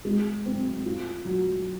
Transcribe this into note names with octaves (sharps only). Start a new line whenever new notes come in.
G#3
C4
F4
F#3